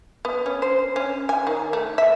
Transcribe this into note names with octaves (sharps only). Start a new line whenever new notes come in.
B3
C#4
C5
C#4
G#5
D#3
A3
E5